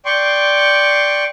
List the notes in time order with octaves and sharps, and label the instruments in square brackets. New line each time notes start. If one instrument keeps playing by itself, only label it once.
[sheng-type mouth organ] D5 G5 C6 C#6